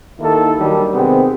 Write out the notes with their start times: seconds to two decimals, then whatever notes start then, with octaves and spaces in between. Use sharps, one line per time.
0.20 D#2 D#3 A#3 E4 A4
0.59 D#2 D#3 F#3 G3 D4
0.93 C3 D#3 G#3 B3 C4